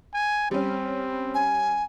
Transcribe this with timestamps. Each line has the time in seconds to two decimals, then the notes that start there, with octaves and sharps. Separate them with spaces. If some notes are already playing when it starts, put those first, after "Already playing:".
0.14 G#5
0.51 G3 C4 C#4
1.34 G#5